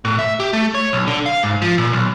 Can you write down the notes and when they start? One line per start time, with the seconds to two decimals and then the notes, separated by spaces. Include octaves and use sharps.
0.05 A2
0.19 E5
0.40 G4
0.53 A3
0.75 C#5
0.93 B1
1.07 D3
1.26 F5
1.43 G#2
1.62 F3
1.78 A#2
1.93 B1